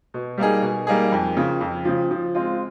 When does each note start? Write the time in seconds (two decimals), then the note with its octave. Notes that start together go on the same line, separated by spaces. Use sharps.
0.14 B2
0.38 G3 A#3 D#4 G#4
0.62 B2
0.87 G3 A#3 D#4 G#4
1.12 F2
1.37 C#3 F3
1.61 F2
1.85 C#3 F3
2.11 F3
2.35 G#3 C4 F4